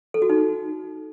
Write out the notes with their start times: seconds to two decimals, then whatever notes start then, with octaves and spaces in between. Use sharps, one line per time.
0.14 A4
0.22 F#4
0.29 D#4